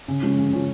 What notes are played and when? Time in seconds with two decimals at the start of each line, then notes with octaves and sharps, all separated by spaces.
0.08 C#3
0.22 F3 G#3 C#4
0.38 C#3
0.53 F3 G#3 C#4